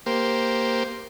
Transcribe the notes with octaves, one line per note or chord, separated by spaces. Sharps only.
A#3 G4 C5